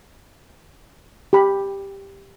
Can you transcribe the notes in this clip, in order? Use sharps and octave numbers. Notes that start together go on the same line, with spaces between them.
G4 B5